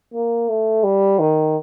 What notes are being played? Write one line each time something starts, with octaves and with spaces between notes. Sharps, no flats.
A#3
A3
G3
D#3